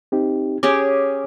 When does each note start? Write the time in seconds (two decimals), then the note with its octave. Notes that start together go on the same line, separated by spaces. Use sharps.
0.12 C4 D#4 G4
0.63 C#4 G4 G#4 C#5 D6